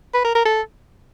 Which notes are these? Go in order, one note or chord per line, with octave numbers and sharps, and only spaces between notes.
B4
A#4
A#4
A4